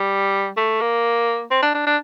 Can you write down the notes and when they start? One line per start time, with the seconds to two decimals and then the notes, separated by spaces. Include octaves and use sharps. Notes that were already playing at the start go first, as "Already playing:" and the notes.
Already playing: G3
0.57 A3
0.81 A#3
1.51 C4
1.62 D4
1.74 D4
1.87 D4